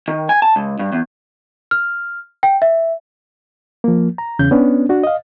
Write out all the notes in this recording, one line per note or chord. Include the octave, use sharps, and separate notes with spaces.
D#3
G#5
A5
C#2
G2
E2
F6
G5
E5
F3 A#3
A#5
E2 C#3 C#4 G6
B3 C#4 D4
D4 F#4
D#5 F5